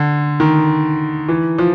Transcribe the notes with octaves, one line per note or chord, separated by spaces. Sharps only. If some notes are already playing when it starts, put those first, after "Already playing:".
Already playing: D3
D#3
E3
F3